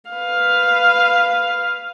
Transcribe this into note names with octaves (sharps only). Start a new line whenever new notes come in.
B4 F5